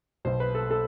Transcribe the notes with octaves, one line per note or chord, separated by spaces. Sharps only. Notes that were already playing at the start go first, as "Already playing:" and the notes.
B1 B2 C5
B4
A4
A4